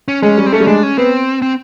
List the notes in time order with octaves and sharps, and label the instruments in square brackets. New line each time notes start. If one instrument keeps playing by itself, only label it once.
[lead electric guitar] C#4
[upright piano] G#3 [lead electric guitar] C#4
[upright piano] G3
[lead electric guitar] C4
[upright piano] A3 [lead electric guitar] C#4
[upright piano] G3
[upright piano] G#3 [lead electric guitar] D4
[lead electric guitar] C#4
[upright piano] B3 [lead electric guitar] C4
[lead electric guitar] C4